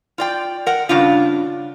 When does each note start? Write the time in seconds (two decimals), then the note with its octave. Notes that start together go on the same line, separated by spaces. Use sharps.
0.18 F4 D5 G5
0.66 A#4 F#5
0.89 G2 C#3 D4 F4